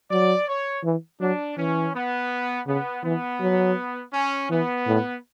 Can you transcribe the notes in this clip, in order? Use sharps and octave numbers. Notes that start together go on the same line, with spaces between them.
F#3 D5
C#5
E3
F#3 D4
E3 C#4
B3
C#3 B3
E3 B3
F#3
C#4
E3 B3
A2